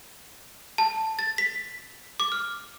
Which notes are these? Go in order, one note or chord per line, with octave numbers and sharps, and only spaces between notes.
A5
A6
B6
D6
F6